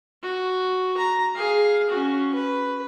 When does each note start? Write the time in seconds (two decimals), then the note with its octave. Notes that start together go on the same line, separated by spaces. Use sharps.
0.23 F#4
0.97 A#5
1.35 G#4 F5
1.90 C#4 F#4
2.34 B4